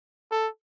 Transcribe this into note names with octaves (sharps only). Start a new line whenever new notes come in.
A4